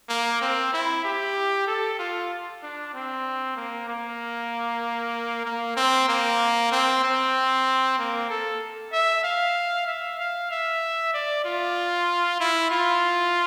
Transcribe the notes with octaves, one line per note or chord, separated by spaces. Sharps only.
A#3
C4
E4
G4
A4
F4
D4
C4
A#3
A#3
A#3
C4
A#3
C4
C4
A#3
A4
E5
F5
E5
F5
E5
D5
F4
E4
F4